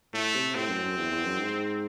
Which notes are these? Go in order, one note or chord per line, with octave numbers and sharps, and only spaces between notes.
A2 A3
C3
A2 C4
F#2
F#2
E2
E2
F#2
G#2